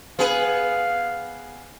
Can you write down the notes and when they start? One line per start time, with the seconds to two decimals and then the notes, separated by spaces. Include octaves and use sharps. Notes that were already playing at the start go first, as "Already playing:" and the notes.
0.19 B3 G#4 B4 F5